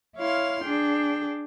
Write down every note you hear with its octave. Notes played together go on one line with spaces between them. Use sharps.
E4 C#5 F5 C6 F6
D4 G#4 G5